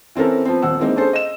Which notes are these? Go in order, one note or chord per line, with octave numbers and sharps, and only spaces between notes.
E3 C4 C#4 A4 A#4
F3 B3 C4
D#1 C4 F#5 E6
E3 G#3 A#3 C4 D#4
C#4 D4 G#4 A4 C5
D#5 E7